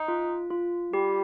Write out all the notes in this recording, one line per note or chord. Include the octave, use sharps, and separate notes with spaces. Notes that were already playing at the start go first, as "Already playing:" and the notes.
Already playing: D#4
F4
F4
G3 G4